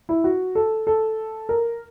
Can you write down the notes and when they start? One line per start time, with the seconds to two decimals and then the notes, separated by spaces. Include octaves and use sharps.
0.09 E4
0.24 F#4
0.55 A4
0.87 A4
1.49 A#4